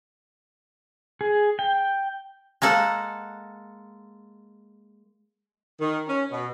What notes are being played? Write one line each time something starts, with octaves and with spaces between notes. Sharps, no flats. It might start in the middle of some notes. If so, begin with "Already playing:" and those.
G#4
G5
G#3 A#3 A4 F#5
D#3
C#4
B2